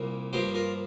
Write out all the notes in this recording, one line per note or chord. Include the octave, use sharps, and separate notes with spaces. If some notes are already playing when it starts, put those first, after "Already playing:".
Already playing: C2 A#2 G3 A#3
G2 F3 A#3 G4 C5
F4 A#4